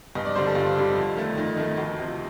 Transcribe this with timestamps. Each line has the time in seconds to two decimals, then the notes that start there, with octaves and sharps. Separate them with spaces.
0.15 G2 D#5
0.25 D5
0.35 D3 G3 C5
0.46 A4
0.55 G2 F4
0.76 D3 G3
0.96 F2
1.16 D#3 A3
1.37 F2 D#4
1.57 D#3 A3
1.78 D2
1.98 C3 F3